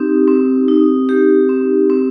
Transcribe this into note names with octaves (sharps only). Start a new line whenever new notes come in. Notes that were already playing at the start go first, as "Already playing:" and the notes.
Already playing: C4 D#4 G4
C4
D#4
G4
C4
C4